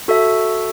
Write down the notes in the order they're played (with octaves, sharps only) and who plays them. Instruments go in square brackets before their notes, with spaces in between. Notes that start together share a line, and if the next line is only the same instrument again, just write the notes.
[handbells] F#4 A4 E5